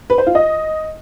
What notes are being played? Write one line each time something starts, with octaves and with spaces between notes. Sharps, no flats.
B4
C5
F4
D#5